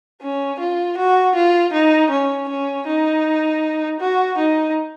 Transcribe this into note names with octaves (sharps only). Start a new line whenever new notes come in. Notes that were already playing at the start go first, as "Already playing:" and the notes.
C#4
F4
F#4
F4
D#4
C#4
C#4
D#4
F#4
D#4